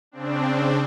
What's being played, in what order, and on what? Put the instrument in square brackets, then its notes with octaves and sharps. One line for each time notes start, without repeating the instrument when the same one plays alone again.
[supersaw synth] C#3 C4 D4